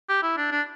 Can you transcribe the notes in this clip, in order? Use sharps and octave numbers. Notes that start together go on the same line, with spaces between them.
G4
E4
D4
D4